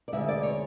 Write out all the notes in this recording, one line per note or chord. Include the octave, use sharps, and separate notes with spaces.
D5
D2 D3 G#3 E5
D5
C#5